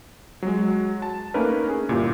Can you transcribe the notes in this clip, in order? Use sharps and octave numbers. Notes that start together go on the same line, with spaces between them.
F#3 G#3
A5
A3 A#3 C#4 D#4 A#4 B4
C#4 G#4
G1 A#2 E4 G4